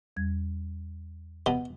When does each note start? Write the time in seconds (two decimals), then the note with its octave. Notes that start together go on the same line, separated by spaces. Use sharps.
0.17 E2 G3 G#6
1.46 B2